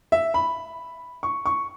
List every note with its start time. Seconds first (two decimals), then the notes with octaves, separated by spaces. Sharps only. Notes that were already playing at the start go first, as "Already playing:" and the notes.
0.12 E5
0.34 B5
1.23 C#6
1.46 C#6